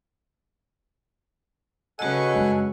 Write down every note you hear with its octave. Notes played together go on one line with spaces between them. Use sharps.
C#3 F#4 A4 B4 D#5 F#5 G#5 C#6
F#2 G#3 C#4